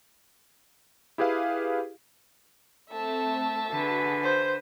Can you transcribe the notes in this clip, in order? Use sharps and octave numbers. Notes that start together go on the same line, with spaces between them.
E4 G4 G#4 B4 F5
A3 C4 E5 A5
D3 F#4 G#4 B4
C5